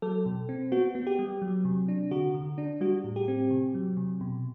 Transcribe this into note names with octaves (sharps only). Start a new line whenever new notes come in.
F#3 A4
B2
C4
B3 F#4
B3
G4
G3
F#3
C3
D4
D3 F#4
D3
D4
G3 F#4
A2
G4
C4
C3
F#3
C3
B2